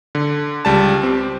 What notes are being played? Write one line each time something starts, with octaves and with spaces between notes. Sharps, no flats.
D3
C#2 G3 A5
C4 G4